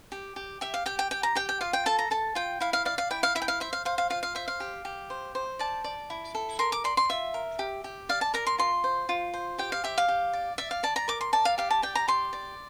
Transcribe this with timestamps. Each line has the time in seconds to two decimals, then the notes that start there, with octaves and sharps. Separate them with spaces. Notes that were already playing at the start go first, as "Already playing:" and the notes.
0.12 G4
0.36 G4
0.61 G4 E5
0.74 F5
0.86 G4 G5
0.99 G5
1.11 G4 G5
1.23 A#5
1.35 G4 G5
1.49 G5
1.61 F4 F5
1.73 G5
1.86 A4 A5
1.99 A#5
2.11 A4 A5
2.35 F4 G5
2.60 E4 F5
2.73 F5
2.85 D5 F5
2.98 F5
3.10 E4 G5
3.23 F5
3.35 E4 E5
3.42 G5
3.48 F5
3.60 C5 E5
3.73 F5
3.85 C5 F5
3.98 F5
4.10 F4 F5
4.23 F5
4.35 C5 E5
4.48 F5
4.60 G4
4.85 G4
5.10 C5
5.35 C5
5.59 D5 A5
5.84 D5
6.10 E4
6.35 A4
6.59 A#4 C6
6.72 D6
6.84 D5 C6
6.97 C6
7.09 F4 E5
7.34 A#4
7.59 G4
7.84 G4
8.09 D5 F5
8.21 A5
8.34 A#4 A#5
8.46 C6
8.58 F4 C6
8.84 C5
9.09 F4
9.34 C5
9.59 G4 G5
9.72 F5
9.84 G4 E5
9.98 F5
10.08 G4
10.33 D5
10.58 D5 E5
10.71 F5
10.83 D5 A5
10.96 A#5
11.08 A#4 D6
11.21 C6
11.33 D5 A5
11.45 F5
11.58 G4 F5
11.71 A5
11.82 D5 G5
11.95 A#5
12.08 G4 C6
12.33 D5